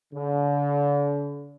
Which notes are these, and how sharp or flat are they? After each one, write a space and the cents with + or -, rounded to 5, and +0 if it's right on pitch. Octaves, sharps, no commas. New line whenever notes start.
D3 -40